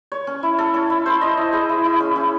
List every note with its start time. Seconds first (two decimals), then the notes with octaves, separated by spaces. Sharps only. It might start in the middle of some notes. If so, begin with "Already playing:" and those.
0.12 C#5
0.27 C#4
0.43 E4
0.58 A4
0.74 C#4
0.90 E4
1.06 C5
1.22 D#5
1.38 E4
1.53 G#4
1.69 E4
1.85 E4
2.00 C#4
2.16 C#4